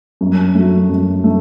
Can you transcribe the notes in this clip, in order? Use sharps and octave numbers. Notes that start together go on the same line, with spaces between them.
F#2
F#3 A3
F#2
A3